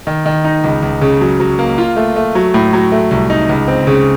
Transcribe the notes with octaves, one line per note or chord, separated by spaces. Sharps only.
D#3
D#3
D#4
C#2
C#2
C#3
F#3
F#3
A#3
F4
A3
A3
F#3
A2
F#3
A3
C2
D#4
C#2
C4
C#3